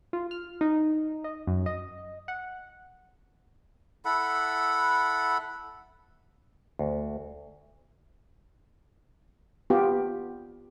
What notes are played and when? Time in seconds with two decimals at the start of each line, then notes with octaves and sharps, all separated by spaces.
0.13 F4
0.31 F6
0.61 D#4
1.24 D#5
1.47 F#2
1.66 D#5
2.28 F#5
4.05 E4 A4 F#5 B5
6.79 D2
9.70 B3 F4 G4